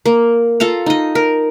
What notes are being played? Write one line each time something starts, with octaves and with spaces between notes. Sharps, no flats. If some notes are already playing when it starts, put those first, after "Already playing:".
A#3
F4 A4 F5 A#5
D#4 D#5
A#4